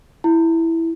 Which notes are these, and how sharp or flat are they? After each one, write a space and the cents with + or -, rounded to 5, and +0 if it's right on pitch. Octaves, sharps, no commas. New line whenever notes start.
E4 +0